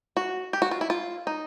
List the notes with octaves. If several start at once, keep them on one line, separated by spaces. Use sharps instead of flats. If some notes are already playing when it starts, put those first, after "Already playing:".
F#4
G4
F#4
F4
E4
F4
D#4